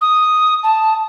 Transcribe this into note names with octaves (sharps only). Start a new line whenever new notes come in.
D#6
A5